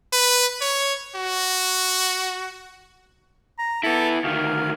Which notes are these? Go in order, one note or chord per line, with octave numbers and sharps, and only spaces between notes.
B4
C#5
F#4
A#5
B3 E4 A4
D2 D#3 F5